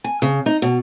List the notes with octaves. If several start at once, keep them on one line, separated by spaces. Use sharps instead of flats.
G#5
C#3
D#4
B2